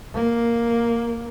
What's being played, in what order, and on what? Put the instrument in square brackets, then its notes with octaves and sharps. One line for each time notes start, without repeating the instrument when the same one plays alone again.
[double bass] A#3